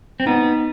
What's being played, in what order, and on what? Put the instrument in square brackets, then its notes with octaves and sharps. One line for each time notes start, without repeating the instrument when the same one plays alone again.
[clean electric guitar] C4
[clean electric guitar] B3 [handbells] D#4